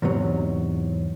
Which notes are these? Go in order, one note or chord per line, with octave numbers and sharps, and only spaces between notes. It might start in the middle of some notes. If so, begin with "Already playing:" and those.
E2 G#2 C3 F#3